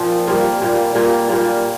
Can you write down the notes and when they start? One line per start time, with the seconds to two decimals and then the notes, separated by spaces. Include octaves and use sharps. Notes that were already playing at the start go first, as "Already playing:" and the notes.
Already playing: A#2 F3 C4
0.27 A#2 G3 A#3 F4
0.61 A#2 G3 A#3 F4
0.95 A#2 G3 A#3 F4
1.28 A#2 G3 A#3 F4